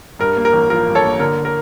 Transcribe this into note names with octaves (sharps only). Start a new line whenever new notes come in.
G2 A#4
A#3
A#4
A1
F3 A#4
G2
A4 C#5
A#3
D3 A#4
A#4